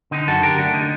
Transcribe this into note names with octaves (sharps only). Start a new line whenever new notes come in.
D3 D#4
F#2 F#4 A4
D3 G4 A#4
A3 D4
D3 D#4